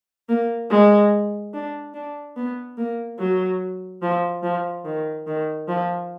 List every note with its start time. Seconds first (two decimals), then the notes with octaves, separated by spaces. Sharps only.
0.29 A#3
0.70 G#3
1.54 D4
1.94 D4
2.36 B3
2.77 A#3
3.19 F#3
4.02 F3
4.43 F3
4.85 D#3
5.27 D#3
5.68 F3